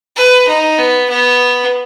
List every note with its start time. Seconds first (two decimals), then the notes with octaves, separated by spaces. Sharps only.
0.17 B4
0.48 D#4
0.78 B3
1.09 B3